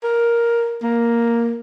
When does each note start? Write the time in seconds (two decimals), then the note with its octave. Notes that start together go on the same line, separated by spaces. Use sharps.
0.04 A#4
0.83 A#3